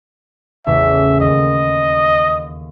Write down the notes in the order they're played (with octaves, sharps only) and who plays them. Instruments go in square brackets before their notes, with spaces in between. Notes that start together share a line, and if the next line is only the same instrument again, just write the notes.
[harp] A1 E2 C#3 [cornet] E5
[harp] D#2 [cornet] D#5